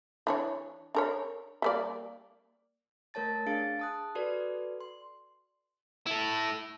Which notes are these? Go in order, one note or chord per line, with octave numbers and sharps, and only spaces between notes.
E3 D4 C#5
D4 A#4 C#5
G3 A#3 D5
A3 A#4 C#5 A5 A6
D4 G#4 F5 A6 D7
A5 D#6 F#6
F#4 A4 B4 D5
C6
E4 A4